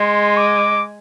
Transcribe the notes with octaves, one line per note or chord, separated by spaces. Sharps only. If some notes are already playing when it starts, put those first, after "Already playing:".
Already playing: G#3 C6
D6